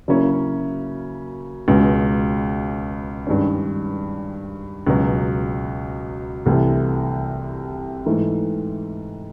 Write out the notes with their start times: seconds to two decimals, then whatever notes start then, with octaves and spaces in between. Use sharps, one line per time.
0.08 C#3 F#3 A#3 C#4 E4
1.68 C#2 B2 G#3
3.27 G2 D#3 G#3 C#4
4.87 C#2 B2 F#3
6.46 C2 C3 E3 A3
8.06 G#2 E3 A3